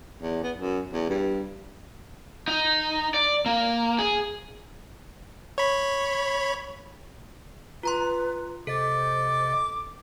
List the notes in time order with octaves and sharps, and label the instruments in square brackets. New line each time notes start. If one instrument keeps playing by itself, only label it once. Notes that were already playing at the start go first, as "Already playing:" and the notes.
[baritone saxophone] E2
B3
F#2
E2
G2
[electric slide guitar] D#4
D5
A#3
G#4
[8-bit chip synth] C#5 B5
[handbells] F4 A#5 C6 [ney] B4
[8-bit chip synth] C3 D#5 A6 [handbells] A4 [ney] C5 [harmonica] D6